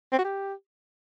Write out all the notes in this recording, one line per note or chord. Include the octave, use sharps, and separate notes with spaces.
C4
F#4
G4